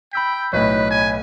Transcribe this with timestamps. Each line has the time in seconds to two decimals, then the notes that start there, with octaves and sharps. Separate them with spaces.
0.13 G5 B5 E6 B6
0.53 B1 A2 B4 C#5 D#5 B5
0.90 G#5